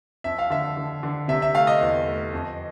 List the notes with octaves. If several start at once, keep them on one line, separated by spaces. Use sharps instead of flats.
F2 E5
F5
D3 E5
D3
D3
C3 E5
E5
A3 F5
D#5
E2
A3
F2